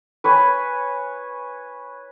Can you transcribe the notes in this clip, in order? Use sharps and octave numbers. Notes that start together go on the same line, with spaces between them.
B4 C#5 G#5